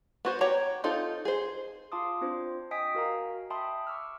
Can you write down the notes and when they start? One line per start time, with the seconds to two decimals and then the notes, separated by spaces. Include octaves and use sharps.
0.25 B3 F#4 C5
0.41 G4 C#5 F#5 A#5
0.84 C4 D#4 F4 A4
1.25 G#4 C5
1.92 F4 F5 A5 C6 D6 D#6
2.21 C4 D4 F4 C5
2.71 D#5 G5 G#5 D#6 B6 D7
2.95 F#4 A#4 F5 A#5
3.50 E5 G5 A5 B5 C6 D#6
3.87 C#6 D6 E6 F6